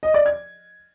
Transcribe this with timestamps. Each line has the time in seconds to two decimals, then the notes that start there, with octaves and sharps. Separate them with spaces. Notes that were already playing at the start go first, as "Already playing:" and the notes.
0.03 D#5
0.14 D5
0.26 G#6